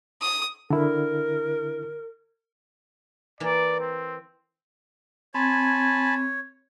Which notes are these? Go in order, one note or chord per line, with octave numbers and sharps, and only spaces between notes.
D#6
D3 E4 A#4
E3 A#3 D5
C4
C4 C#5 G#5 A5 B5